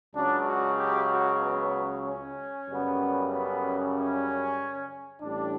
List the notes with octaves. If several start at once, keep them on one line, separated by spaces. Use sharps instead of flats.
C#2 C#3 F#3 D4
F#4
G4
F#4
B3
C#4
F#2 C#3 G3 B3
B3
C#4
A1 A2 G3 D4